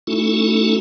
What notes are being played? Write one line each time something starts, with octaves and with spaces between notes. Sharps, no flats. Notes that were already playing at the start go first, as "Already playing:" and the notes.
A3 C#4 D#4 E4 F#4 A4